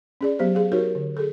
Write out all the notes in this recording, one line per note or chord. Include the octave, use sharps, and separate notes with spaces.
C#4 G#4 D5
F#3 B3 G4 C5
G#4 F5
D#4 F#4 G4 A#4 C#5
D3
G#4 A4